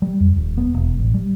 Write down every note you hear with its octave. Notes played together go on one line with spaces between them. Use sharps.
G3
F2
D#1
B3
E1
A1
G3